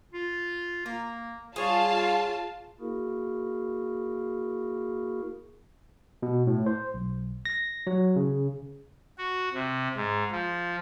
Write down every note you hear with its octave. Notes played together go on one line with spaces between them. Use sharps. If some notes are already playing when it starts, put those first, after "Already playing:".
F4
A#3 A#4
G3 F4 G#4 C#5 F5 A5
A#3 E4 F#4 G#4 A#4
B2
A2
C5
B1
A#6
F#3
C#3
F#4
C3
G#2
F3